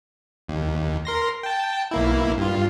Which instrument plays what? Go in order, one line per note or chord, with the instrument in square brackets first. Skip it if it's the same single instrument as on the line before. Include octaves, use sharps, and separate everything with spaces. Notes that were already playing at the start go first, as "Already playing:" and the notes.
[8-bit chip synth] D#2
A#4 C6 A#6
G5 A5
B1 A#3 E4
G2 F4